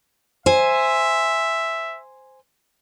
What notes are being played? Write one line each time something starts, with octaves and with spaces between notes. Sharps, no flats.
C5 E5 G#5